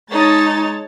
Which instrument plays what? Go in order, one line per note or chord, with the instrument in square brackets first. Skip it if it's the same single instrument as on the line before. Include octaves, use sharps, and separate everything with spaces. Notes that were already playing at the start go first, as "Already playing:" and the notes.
[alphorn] G#3 [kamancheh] D#4 [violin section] C#5 A5 A6